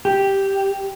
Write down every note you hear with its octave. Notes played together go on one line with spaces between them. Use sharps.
G4